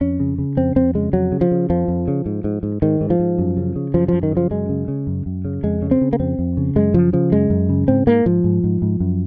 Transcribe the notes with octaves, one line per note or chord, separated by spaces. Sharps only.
F2 C#4
C#3
C#3
F2 C4
F2 C4
C#3 G#3
F2 F#3
C#3
F3
C#3
F2 F3
F2
C#3
G#2
G#2
G#2
G#2 D#3
G#2
F3
G#2
F#2
C#3
C#3
F#2 F3
F#2 F3
D#3
C#3 F3
F#2 G#3
C#3
C#3
F#2
F#2
C#3
F2 G#3
C#3
C4
C#3
A#3
F2 C4
F2
C#3
F#2 G#3
C#3 F3
C#3 F3
F#2 G#3
F#2
C#3
G#2 C4
G#2 A#3
G#2 F3
G#2
G#2
G#2
F#2